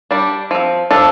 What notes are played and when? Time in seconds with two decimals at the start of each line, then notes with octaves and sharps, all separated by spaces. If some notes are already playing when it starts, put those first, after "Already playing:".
0.11 G3 D4
0.51 F3 C4
0.91 F3 D4 A4